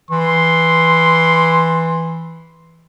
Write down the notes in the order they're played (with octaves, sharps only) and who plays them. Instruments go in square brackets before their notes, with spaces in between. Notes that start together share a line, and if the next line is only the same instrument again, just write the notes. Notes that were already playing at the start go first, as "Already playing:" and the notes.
[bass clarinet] E3 [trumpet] C6